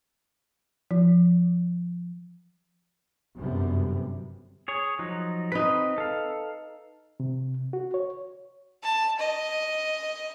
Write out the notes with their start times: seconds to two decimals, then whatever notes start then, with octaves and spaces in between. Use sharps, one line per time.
0.91 F3
3.37 G1 F#2 C3 G3 B3
4.68 G#4 C#5
4.99 F3 F#3 D#4
5.52 C4 D#4 B4 B5
5.98 A4 F5
7.20 C3
7.73 F#4
7.94 C#5
8.83 A5
9.19 D#5